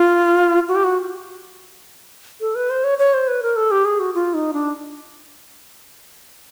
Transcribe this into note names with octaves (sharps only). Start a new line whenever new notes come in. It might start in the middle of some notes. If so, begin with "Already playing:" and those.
Already playing: F4
F#4
G4
F#4
A4
B4
C5
C#5
C#5
C5
B4
A#4
A4
G4
G#4
F#4
F4
D#4
D4